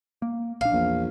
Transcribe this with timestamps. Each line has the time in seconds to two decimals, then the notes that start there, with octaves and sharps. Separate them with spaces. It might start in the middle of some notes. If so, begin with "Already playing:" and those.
0.22 A#3
0.61 A#1 D4 F5
0.73 A#1 E2